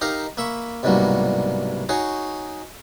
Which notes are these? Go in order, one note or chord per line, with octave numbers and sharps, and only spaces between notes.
D#4 G4 A#4 F5 A#5
A#3 E5 B5 C#6
C2 G#2 B2 F#3 G3 A#3
D#4 F#4 G#4 C#5